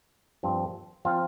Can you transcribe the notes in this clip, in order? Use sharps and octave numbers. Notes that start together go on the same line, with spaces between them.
G2 F3 C4
F3 C4 F4